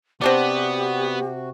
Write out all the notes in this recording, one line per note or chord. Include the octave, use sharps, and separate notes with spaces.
C3 B3 C4 D4 F#4 G4 D5